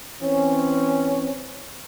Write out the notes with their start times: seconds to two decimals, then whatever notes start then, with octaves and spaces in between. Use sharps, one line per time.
0.22 E3 C4 C#4